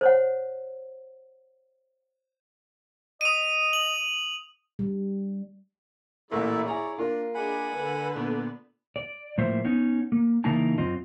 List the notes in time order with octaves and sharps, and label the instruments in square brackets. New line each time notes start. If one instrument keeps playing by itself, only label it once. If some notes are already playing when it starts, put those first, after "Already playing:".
[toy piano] C5 C#5 F#5
[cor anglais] D#5 [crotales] D#6 D#7
[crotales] F#7
[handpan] G3
[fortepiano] A1 A#2 [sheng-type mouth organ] E4 A4 E5 [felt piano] A#4 F#5 [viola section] D5
[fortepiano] E4 A#5 [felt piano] G#4 G#5 [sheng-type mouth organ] C#5
[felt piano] A#3 A#4 [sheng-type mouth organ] D4 [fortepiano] F4
[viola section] D4 G#4 D#5 [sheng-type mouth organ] F#5 G#5 B5
[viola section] D3 A4 B4
[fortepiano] A#2 B3 D4
[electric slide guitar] D5
A2 F3 A#3 C5 E5
B3 C#4 D#4
A#3
C#3 E3 A#3 D#4 E4 A5
F#2 C4 F4 D#5